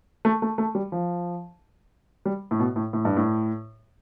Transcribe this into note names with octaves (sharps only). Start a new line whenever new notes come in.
A3
A3
A3
G3
F3
G3
A2
B2
A2
A2
G2
A2